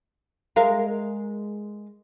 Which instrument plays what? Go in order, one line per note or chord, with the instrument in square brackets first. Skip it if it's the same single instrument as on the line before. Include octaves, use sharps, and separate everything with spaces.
[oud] G#3 A#4 F5